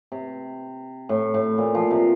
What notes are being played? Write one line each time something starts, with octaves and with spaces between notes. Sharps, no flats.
C3
A2
A2
A#2
F3
C3